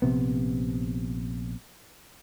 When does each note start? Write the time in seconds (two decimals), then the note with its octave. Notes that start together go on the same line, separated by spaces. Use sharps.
0.02 A#1 C3 B3